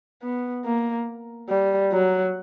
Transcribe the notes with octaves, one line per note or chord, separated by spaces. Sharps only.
B3
A#3
G3
F#3